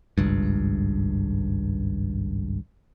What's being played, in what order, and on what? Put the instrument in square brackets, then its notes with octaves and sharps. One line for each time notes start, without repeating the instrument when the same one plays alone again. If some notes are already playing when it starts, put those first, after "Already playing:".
[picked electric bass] G#1 C#2 G2